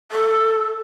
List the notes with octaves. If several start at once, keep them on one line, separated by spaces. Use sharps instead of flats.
A4